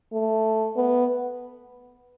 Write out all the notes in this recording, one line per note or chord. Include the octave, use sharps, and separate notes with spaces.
A3
B3